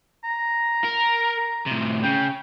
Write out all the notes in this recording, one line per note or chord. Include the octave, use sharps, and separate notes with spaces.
A#5
A#4
A2 C3
C#3 G5